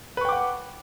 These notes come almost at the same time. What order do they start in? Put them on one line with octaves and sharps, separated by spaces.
B4 C#6 G5 D6 F#5